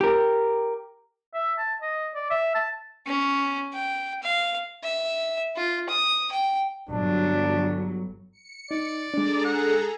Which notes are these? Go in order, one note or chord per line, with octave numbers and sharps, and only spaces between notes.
G4 A#4
E5
A5
D#5
D5
E5
A5
C#4
G5
F5
E5
F4
D#6
G5
G1 F#3 D4
C#7
D#4 D5
G#3 D4 G#4 A4 A#5
F#5